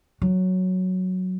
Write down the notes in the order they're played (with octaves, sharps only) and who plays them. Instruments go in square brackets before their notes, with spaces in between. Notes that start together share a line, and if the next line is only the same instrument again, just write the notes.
[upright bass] F#3